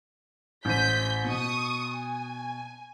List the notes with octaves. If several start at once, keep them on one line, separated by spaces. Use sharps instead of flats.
A1 C5 G6 B6 D#7
B2 C#6 D#6
G#5